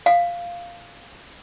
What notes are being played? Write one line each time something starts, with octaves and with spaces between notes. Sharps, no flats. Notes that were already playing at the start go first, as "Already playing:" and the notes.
F5